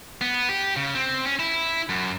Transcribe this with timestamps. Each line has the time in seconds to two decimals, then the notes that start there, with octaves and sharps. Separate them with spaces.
0.21 B3
0.49 G4
0.76 C#3
0.95 C4
1.25 C#4
1.39 E4
1.89 F#2